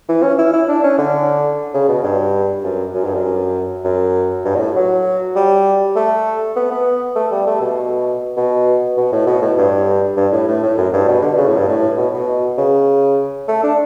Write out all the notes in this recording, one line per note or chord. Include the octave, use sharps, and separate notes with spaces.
E3
C#4
E4
E4
D4
C#4
D3
C#3
B2
G2
F#2
F#2
G2
F#2
F#2
G2
B2
A2
F#3
G3
A3
B3
B3
A3
G3
A3
B2
B2
B2
A2
B2
A2
G2
G2
A2
A2
A2
F#2
G2
B2
D3
C#3
A2
G2
A2
B2
B2
C#3
A3
D4